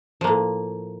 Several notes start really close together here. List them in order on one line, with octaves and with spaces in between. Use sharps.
F3 A#3 A2